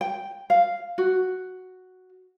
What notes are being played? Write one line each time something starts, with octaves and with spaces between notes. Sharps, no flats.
G5
F5
F#4